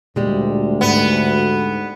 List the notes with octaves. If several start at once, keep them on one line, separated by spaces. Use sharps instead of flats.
D2 A#2 G3 G#3
G#2 B3